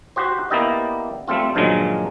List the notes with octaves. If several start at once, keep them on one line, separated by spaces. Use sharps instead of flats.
F#4 G4 C5
A#3 B3 E4 G4 D5 D#5
G3 A3 C4 F4
G2 A#2 D#3 F3 F#3 G#3